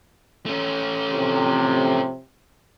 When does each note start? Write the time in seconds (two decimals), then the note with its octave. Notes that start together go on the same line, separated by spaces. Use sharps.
0.46 A3 C#4
1.11 F2 A2 C3